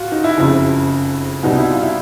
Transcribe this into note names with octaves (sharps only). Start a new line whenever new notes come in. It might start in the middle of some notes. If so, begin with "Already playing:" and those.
Already playing: F4 F#4
D#4
E4
F#1 F2 C#3
C2 B2 G3 B3 D#4
E4
F4
E4